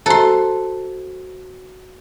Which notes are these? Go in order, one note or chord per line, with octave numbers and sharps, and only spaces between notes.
F#4 A4 C5 A#5 C6